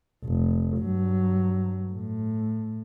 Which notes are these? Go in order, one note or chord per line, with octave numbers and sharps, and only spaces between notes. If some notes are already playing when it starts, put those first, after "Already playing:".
F1
G2 F#3
A2